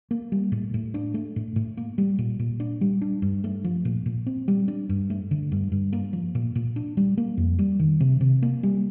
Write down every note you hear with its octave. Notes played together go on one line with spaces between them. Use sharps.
A#3
G3
A2
A2
D4
A3
A2
A2
A#3
G3
A#2
A#2
D4
G3
D4
G2
A3
F3
A#2
A#2
C4
G3
D4
G2
A3
D3
G2
G2
A#3
F3
A#2
A#2
D4
G3
A#3
F2
G3
D#3
C3
C3
A#3
G3